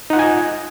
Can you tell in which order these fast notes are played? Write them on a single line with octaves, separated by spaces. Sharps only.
D#4 F#5 F4 G#5 D#5